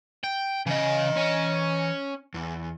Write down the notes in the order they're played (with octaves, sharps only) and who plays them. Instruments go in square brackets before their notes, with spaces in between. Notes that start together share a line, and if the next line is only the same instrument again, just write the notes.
[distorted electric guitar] G5
[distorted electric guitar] C#3 [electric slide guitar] E3 D#5
[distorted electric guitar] C#4
[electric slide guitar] E2